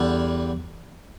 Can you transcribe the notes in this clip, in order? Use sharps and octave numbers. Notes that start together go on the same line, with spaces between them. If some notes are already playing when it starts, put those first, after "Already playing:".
Already playing: E2 D3 G3